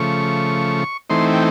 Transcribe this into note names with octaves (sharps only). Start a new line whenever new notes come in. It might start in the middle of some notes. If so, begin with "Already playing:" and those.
Already playing: C#3 F3 A3 C#6
E3 A3 C4 D#4 C6
G5